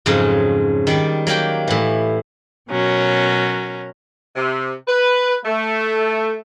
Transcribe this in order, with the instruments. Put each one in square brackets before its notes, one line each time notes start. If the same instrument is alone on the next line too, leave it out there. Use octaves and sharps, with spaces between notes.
[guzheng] F2 G#2 C#3 F#3
D#3 G3 D5
F#3 A#3 G4 G5
A2 E3
[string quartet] B2 F#3 C#4 A#4
[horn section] C3
B4
A3